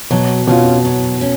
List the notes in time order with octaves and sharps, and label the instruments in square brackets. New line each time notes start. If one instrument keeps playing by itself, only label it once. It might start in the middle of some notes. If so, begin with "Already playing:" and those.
[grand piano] B2 [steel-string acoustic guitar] F#3
[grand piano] B2 [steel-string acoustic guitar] C#4 F4
[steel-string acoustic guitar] F#3
C#4